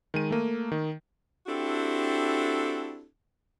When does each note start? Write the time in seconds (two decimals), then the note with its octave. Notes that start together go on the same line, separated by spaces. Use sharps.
0.14 D#3 G#3 D#7
0.31 A3 A#3
0.72 D#3
1.47 C4 D4 E4 F#4 G4 A4